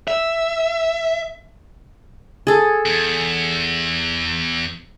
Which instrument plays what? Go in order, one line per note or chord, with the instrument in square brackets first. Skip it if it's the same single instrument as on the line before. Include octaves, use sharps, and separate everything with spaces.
[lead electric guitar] E5
[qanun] G#4 A4
[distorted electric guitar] E2